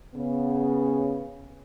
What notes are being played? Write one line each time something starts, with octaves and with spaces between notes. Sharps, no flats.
C#3 B3